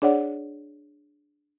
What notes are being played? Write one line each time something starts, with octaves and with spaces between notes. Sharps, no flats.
D4 G#4 C#5 D5 F#5